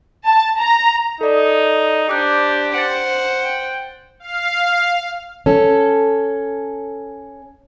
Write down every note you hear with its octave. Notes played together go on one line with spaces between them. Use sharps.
A5
A#5
D#4 A4 D5
D4 G4 C5 D6 F#6 G6
C5 F#5 A6 D7
G5
F5
C#4 A4